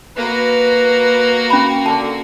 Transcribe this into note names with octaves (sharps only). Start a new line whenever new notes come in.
A#3 F#4 B4
C#4 B5
D3 A5